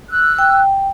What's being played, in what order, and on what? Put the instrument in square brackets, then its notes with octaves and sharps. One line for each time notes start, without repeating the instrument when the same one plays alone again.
[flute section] E6 F#6
[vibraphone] G5